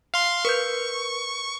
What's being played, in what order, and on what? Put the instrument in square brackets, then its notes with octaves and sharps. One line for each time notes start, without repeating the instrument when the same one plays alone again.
[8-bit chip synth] F5 C6
[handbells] A#4 B4 G6 [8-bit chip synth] C#6